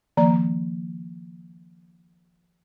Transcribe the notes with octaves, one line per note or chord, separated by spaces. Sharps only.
D#3 F3 A#3 D5 A#5